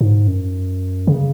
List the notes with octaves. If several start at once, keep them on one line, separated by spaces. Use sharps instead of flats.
G#2
F#2
C#3